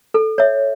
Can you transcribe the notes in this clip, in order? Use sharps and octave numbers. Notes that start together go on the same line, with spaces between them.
A4
C#5 E5